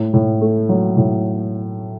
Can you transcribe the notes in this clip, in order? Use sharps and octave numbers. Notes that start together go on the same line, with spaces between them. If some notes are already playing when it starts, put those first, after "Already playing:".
Already playing: A2
A2
A3
F#3
A2